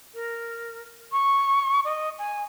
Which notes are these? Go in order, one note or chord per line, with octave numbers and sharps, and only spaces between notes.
A#4
C#6
D#5
G#5